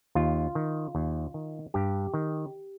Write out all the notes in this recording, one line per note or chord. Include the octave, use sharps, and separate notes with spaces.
D#2 F4
D#3
D#2
D#3
G2 G4
D#3